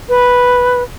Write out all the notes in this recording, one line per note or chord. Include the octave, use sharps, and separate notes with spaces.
B4